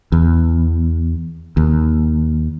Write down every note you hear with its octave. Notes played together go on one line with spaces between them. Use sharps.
E2
D#2